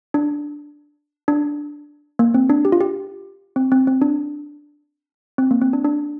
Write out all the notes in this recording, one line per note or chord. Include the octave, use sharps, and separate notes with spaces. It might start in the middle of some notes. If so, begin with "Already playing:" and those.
D4
D4
A#3
C4
D4
G4
F4
G4
C4
C4
C4
D4
C4
A#3
C4
D4
D4